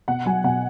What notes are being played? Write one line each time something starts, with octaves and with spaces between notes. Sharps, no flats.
B2 F#5
F#3 G#5
B2 F#5